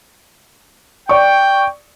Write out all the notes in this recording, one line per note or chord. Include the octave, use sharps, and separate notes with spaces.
D5 G5 C#6